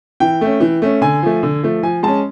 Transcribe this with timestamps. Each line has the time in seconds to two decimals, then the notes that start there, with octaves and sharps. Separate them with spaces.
0.20 E3 G5
0.41 A3 C#4
0.60 E3
0.82 A3 C#4
1.01 D3 G#5
1.23 F3 A3
1.43 D3
1.63 F3 A3
1.83 F3 G#5
2.03 G#3 C#4 A5